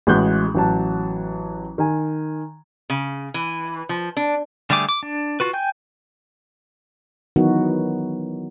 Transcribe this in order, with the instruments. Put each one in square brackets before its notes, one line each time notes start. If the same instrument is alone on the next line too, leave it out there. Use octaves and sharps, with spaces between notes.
[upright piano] A1 G#3 F#4 C6 F#6 G6
A1 F#3 A5
D#3 G#5
[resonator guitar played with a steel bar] C#3
E3
F3
D4
[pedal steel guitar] D3 G3 A3 G#4 D6
D6
D4
F4 F#4 B4
G5 G#5 G6
[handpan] D#3 E3 F#3 B3 D#4 F#4